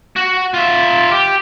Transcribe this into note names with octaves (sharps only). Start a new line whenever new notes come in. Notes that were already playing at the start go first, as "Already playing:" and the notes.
F#4
F4 E5
G4